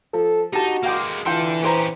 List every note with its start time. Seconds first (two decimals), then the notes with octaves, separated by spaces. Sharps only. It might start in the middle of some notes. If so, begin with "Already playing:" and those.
0.14 F3 A4
0.53 D#4 F#4 G4 A5
0.84 G#3 A#3 F5 G5 D6
1.26 E3 D4 F4 A4 G5 C6
1.63 C#4 G4 B4 C5 A#5